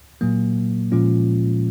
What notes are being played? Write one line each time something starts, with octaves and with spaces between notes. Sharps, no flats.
A#2 F#3 A#3
A#2 F3 G#3 C#4 F4